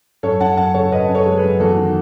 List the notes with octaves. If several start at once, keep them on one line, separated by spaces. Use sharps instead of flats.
F#2 A4 C#5
F#2 F#5 A5
F#2 F#5 A5
C#3 A4 C#5
F#2 B4 D#5
F#2
A4 C#5
G#3
G#4 B4
F#2
E2 F#4 A4
D#3